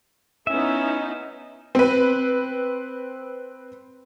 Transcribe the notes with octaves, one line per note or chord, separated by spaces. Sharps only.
B3 C#4 D#4 E4 E5
C4 B4